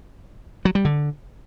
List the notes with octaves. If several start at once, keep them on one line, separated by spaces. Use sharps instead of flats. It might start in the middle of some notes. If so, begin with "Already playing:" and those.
F#3
G3
D3